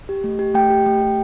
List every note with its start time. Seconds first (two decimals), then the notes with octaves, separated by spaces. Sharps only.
0.09 G4
0.24 A3
0.39 G4
0.55 A3 G5
0.70 G4
0.86 A3
1.02 G4